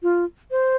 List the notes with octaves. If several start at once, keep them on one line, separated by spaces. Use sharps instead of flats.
F4
C5